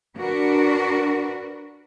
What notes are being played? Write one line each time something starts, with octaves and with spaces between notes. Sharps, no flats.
D4 F#4 A#4 B4